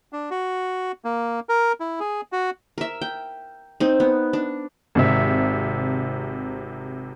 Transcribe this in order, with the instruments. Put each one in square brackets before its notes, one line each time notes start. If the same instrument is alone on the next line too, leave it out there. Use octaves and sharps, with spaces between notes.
[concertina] D4
F#4
A#3
A#4
E4
G#4
F#4
[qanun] A#4 E5
G5
C4 D#4
B3
D4
[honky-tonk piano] G#1 C3 E5